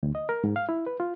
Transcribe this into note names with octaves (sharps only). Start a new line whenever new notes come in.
D2
D#5
A#4
G#2
F5
E4
B4
F4